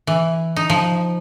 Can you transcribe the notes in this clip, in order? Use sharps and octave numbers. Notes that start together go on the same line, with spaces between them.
E3
D#4
F3